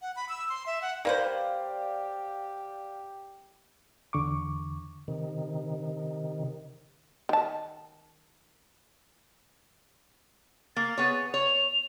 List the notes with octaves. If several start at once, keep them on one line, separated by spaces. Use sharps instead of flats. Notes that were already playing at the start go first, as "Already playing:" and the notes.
F#5
B5
E6
C6
E5
F#5
A#3 G4 B4 C5 D5 F5
E2 D3 C#6 D6
C3 D#3
D#3 A5
A#3 A6
B3 G#4 C#5
C#5 F7